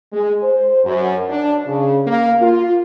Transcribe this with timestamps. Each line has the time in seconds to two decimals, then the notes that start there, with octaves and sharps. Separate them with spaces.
0.13 G#3
0.43 C5
0.85 F#2
1.30 D4
1.67 C#3
2.07 A#3
2.42 F4